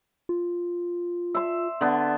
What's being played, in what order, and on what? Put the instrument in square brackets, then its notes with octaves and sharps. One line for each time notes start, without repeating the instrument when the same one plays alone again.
[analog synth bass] F4
[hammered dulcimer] E5 C6
D3 B3